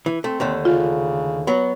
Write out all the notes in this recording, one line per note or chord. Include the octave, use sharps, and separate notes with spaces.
E3
A3 C4
D#2 D3 A3
C#3 F4
F#3 B3